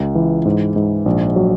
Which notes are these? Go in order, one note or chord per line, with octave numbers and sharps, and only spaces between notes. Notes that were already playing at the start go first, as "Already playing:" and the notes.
Already playing: C#2
E3
G#2
G#2
A#1
F#3